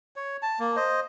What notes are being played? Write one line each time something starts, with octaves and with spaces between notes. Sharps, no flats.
C#5
A5
A#3
C5 D#5